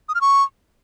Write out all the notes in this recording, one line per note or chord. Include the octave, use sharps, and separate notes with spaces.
D#6
F6
C#6